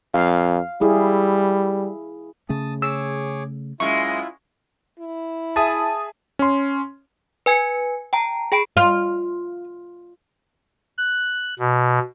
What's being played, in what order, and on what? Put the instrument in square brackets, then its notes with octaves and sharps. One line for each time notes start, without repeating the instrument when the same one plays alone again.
[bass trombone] F2 [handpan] F5
[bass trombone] G3 [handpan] E4 G#4
[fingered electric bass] C#3 A3 C#4 [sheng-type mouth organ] A5 D#6
[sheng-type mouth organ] G#4 C#5 D6 [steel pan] E6
[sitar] F#2 G#3 [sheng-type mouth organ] E4 F4 E5 [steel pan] C#6
[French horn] E4
[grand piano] G#4 E5 G#5 [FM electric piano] A5 D#6
[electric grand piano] C#4 C6
[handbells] B4 G#5 G#6 C#7
G5 A5 A#5
G#4 G5 B5 D7
[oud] F4
[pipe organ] F#6
B2